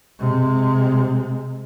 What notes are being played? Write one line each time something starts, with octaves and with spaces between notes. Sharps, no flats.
C3 G#3